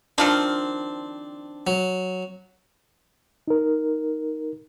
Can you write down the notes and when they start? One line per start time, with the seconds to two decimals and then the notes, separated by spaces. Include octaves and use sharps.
0.18 D#3 F3 C4 D4
1.67 F#3
3.48 D#4 A#4